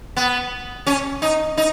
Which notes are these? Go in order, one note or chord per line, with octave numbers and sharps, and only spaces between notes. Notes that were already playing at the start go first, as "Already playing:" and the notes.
B3
C#4
D#4
D#4